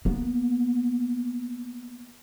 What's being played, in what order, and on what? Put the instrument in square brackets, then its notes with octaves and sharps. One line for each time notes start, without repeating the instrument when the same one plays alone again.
[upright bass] A#3 B3